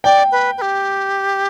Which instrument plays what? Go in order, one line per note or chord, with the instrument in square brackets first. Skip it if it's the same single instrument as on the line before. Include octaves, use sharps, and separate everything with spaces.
[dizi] D5 [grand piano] G5
[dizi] B4
B4
G4